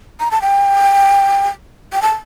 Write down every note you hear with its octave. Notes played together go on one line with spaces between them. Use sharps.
A#5
A5
G5
G5
A5